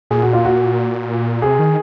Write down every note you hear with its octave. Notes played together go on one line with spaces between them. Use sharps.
A#2 G#4
F#4
F4
F#4
C3 G#4
D#3